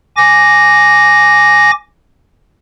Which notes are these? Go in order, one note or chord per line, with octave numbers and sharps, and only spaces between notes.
G#5 D6 A#6